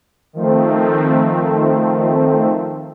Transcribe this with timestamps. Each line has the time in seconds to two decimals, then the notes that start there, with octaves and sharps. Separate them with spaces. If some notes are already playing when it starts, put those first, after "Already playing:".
0.33 D#3 F3 A3 C4